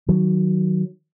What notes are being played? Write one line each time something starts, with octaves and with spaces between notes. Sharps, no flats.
D#3 F#3